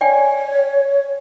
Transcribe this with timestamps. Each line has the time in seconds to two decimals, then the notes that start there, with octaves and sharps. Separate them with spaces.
0.01 C#5 D5 G5 G#5